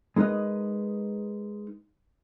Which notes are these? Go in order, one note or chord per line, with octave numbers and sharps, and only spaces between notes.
G#3 D#4 A#4 B4 D#5